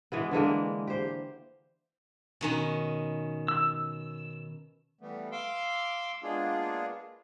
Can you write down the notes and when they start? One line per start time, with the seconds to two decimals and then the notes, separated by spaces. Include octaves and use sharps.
0.12 E3 G#3 B3
0.31 D3 E3 G#3 A#3
0.87 G4 C5
2.41 B2 D#3 C#4
3.48 E6
5.01 E3 G3 A3 B3
5.32 F5 C6 D6 E6
6.23 G#3 A#3 B3 D4 F4 G#4